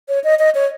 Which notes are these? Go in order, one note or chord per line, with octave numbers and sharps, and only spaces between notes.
C#5
D#5
D#5
C#5